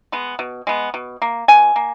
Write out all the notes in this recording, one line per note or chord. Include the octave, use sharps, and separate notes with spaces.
G#3 B3
B2
G#3 B3
B2
A#3
B2 G#5
A#3